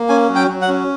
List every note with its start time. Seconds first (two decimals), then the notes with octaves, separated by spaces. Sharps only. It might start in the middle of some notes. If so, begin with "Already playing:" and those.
Already playing: A#3
0.09 C#4 G#5
0.29 F#3
0.35 G5
0.48 F#3
0.62 F#5
0.68 C#4